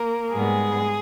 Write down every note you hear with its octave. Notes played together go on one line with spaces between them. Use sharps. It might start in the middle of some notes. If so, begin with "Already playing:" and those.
Already playing: A#3 A#4
G#2 G3 G#3 B3 G#4